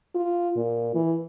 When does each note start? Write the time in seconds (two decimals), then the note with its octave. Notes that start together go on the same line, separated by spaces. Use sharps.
0.15 F4
0.56 A#2
0.94 E3